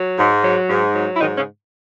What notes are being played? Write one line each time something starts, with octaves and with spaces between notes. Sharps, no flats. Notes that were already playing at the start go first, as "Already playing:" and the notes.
Already playing: F#3
G#2
F#3
G#2
F#3
E4
G#2 D#3 D#4
C#3 C#4